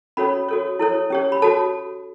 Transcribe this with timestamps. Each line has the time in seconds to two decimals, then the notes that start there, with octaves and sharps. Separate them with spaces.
0.17 C#4 F#4 A4 C#5 B5
0.49 F#4 A4 C#5
0.79 E4 A4 C#5
1.10 C#4 G4 C#5
1.32 B5
1.42 F#4 A4 C#5 A5